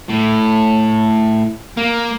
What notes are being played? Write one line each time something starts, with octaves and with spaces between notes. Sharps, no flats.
A2
A#3